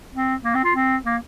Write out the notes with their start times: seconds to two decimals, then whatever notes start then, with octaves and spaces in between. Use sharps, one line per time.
0.14 C4
0.44 A#3
0.55 C4
0.64 F4
0.75 C4
1.06 A#3